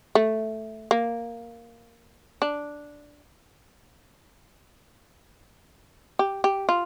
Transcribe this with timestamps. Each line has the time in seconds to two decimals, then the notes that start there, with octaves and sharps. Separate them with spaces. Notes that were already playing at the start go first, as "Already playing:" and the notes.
0.15 A3
0.91 A#3
2.42 D4
6.19 G4
6.44 G4
6.69 F4